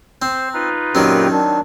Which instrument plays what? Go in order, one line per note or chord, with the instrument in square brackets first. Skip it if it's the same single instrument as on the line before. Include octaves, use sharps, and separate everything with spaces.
[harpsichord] C4 [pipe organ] C5
[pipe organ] D#4 F4 B4
[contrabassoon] F#2 [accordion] A#2 G4 G5 [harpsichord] D#3 F#3 C4
[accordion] D4